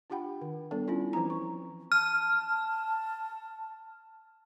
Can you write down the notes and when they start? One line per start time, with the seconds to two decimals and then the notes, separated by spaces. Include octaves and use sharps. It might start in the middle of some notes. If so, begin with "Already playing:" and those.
0.10 D4 F4 G4 F#5 G5 B5
0.41 D#3
0.71 G3 B3 D4 A4
0.88 C#4 E4 F4
1.13 E3 F3 C4 E4 A#5
1.30 C#6
1.92 A5 F6